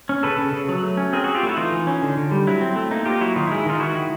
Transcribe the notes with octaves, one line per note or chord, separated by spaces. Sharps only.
C#4
C#3 A4 B4
C#3
C#3
F#3
A3
C#4
C4 G#4 A#4
C4 F#4 G#4
F4 G4
A3 E4 F#4
E3 D#4 F4
E3
C#4
D3
D3
G3
F#3 E4
C4
A3
A#3 D#4
A#3 F4 G4
F#3 E4 F#4
D#3 D#4 F4
E4
G#3
E4
D#3 D#4 F4
D#3 E4 F#4
D#3